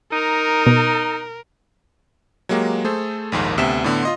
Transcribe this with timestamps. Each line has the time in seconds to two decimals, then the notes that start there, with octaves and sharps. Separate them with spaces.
0.12 D#4 A#4
0.66 B2
2.49 F#3 G#3 A#3 G4
2.84 A3 G#4 A4 C5
3.32 A#1 D#2 G#2 A#3
3.58 D2 C3 B3 E5 E7
3.84 A2 D3 B3
4.03 F4 D#5 C6